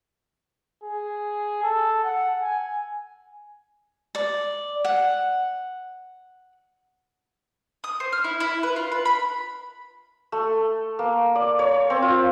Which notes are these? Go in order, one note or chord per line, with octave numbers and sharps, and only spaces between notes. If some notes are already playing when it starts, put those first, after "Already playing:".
G#4
A4
F#5
G#5
D5
F#5
D#6
C5
F6
E4
E4
B4
F4
B4
B5
A3
A#3
D5
C#5
C4
F4